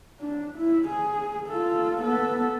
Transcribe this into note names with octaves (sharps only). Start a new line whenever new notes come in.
D4
E4
G#4
F4 A4
B3 A4